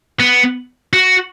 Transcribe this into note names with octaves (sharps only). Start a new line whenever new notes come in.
B3
F#4